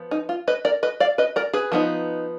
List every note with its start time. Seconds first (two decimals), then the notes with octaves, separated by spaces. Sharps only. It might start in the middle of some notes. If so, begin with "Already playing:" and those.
Already playing: F3 B3
0.11 D#4
0.29 F4
0.48 B4 D#5
0.65 A#4 D5
0.83 B4 D#5
1.00 D5 F5
1.18 B4 D#5
1.36 A#4 D5
1.53 G#4 B4
1.72 F3 B3 D#4